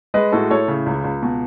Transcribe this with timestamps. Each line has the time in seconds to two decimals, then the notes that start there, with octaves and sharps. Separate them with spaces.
0.14 G#3 B4 D#5
0.32 A2 F#4 A4
0.50 A2 A4 C#5
0.68 C#3
0.86 C#2
1.04 C#2
1.23 B2